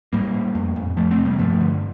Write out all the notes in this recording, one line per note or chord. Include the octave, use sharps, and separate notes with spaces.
A2 G3 A#3
A2
F2
F2
F2 F3 A3
A3 C4
C3
G3 A#3
G2 F3 A3
D3